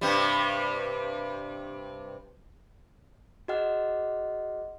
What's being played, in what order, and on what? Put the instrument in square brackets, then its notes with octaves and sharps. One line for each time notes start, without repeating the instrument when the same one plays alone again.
[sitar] G2 C3 G3
[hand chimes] F#4 G#4 D#5 F#5 F6